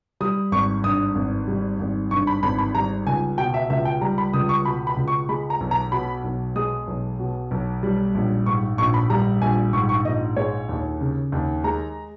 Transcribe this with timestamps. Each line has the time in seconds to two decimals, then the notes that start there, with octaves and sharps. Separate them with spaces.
0.20 G3 D#6
0.52 G#1 C#6
0.84 G2 D#6
1.15 G#1
1.48 G3
1.79 G#1
2.11 G2 C#6
2.27 B5
2.43 G#1 B5
2.58 B5
2.75 G3 A#5
3.06 C#2 G#5
3.38 B2 G5
3.54 E5
3.70 C#2 E5
3.85 G5
4.01 G3 A#5
4.18 B5
4.34 C#2 D#6
4.49 C#6
4.65 B2 B5
4.87 B5
4.97 C#2
5.08 C#6
5.29 G#3 B5
5.50 A#5
5.61 B1
5.71 A#5
5.92 B2 B5
6.24 B1
6.56 G#3 D#6
6.87 B1
7.19 B2
7.51 B1
7.83 G3
8.15 A#1
8.46 G#2 C#6
8.78 A#1 C#6
8.94 B5
9.10 G3 A#5
9.42 A#1 G#5
9.73 G#2 C#6
9.89 C#6
10.05 A#1 D#5
10.37 G#3 C#5
10.69 D#2
11.01 C#3
11.32 D#2
11.64 G#3 A#5